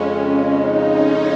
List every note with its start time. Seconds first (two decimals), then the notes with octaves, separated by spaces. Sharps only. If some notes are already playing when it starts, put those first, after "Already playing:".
Already playing: F2 C#3 G#3 C#4
0.60 D#4
0.94 C#4